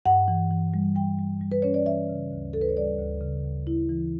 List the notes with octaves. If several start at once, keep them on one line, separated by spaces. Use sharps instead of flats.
G2 F#5
E3
E3
G3
G3 G5
G3
G3
B4
C#4 C#5
D5
E3 E5
C#3
D2
D2 A4
B4
C#5
G3 D5
D2
C#3
D2
E4
E3